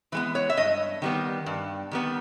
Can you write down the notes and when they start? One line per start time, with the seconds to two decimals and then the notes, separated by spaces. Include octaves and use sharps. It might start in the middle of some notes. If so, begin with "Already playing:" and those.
0.12 E3 G#3 B3 B4
0.35 C#5
0.50 E5
0.57 G2 D#5
1.02 D#3 G3 B3
1.46 G2
1.91 D#3 G3 B3